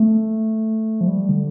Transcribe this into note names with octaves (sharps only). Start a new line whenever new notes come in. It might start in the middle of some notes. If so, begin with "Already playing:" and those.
Already playing: A3
F3
G3
D3